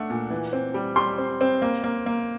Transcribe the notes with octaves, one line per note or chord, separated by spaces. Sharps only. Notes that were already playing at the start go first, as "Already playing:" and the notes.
Already playing: A3 D4 F#5
A#2
E3
C4
G3
G3 C6
C4
C4
A#3
A#3
A#3